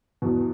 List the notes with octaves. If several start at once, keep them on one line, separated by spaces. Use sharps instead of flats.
E2 B2